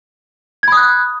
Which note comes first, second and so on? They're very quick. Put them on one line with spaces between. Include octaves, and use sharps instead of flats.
G#6 B5 D#6 F#6